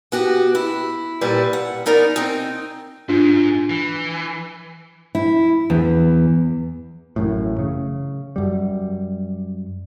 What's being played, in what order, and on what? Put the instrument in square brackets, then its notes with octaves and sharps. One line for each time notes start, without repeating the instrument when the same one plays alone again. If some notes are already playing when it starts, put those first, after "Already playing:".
[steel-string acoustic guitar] B3 F#4 G4
E4
A#2 G3 E4 B4
F#5
B3 D#4 A#4 D5
C4 D#4
[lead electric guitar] G#2 [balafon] D4 F4
[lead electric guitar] E3
[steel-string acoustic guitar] E4
E2
[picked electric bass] A1 F#2 A2
C#3
F#2 G3